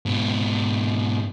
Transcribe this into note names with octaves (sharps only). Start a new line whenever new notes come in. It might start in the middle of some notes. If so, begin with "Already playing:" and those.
G#2 B2